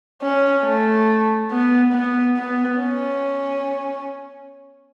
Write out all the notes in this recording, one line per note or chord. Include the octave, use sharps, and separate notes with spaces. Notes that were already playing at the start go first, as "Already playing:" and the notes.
C#4
A3
B3
B3
B3
C#4